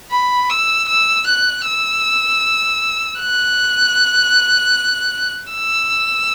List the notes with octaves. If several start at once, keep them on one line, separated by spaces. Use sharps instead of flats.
B5
E6
E6
F#6
E6
F#6
E6